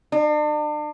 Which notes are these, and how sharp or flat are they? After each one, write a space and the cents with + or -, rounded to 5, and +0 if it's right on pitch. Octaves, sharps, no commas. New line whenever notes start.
D4 +40